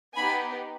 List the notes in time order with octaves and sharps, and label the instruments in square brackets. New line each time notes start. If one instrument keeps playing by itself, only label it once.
[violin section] B3 D#4 G4 G#5 B5